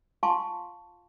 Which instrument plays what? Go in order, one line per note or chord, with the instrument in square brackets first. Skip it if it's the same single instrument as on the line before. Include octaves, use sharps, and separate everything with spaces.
[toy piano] F4 F5 G#5 A5 C6 C#6